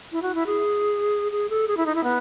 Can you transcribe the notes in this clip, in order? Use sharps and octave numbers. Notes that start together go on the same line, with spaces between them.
E4
F#4
E4
G#4
G#4
A4
G#4
E4
D#4
E4
B3